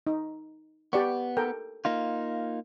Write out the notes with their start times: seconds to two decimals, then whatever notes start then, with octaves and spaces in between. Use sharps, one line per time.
0.07 D#4
0.93 B3 G4 D5 C#6
1.37 A4 A#4 G5
1.85 A#3 D#4 F4